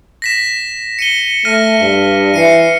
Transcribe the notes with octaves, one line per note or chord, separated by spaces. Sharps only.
A#6 B6 E7
C#7 D#7 G7
A3 F6 A#6 D#7
G2
E3 C7 C#7 D#7